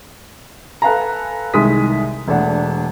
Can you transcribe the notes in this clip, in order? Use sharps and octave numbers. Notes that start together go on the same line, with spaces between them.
A4 B4 F5 G#5 A#5
C2 D#3 G#3 G#4 D#6 B6
E1 A3 D4 F#5